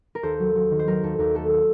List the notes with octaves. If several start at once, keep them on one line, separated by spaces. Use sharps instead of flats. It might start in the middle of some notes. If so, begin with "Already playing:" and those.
A#4
D#2 A4 C5
F#3
F#3
D#3
C5
F#3 A#4
D#2 A4
D#2 A#4
A3 A4
A4